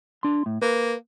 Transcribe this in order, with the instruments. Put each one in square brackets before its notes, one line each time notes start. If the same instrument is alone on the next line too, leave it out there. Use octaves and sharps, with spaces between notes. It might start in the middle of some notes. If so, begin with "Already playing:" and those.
[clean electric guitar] D4 C6
A2
[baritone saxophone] A#3 [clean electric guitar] B4